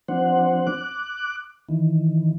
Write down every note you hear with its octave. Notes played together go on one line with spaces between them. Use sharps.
F3 C4 D4 C5 F#5
D6 F#6
D#3 E3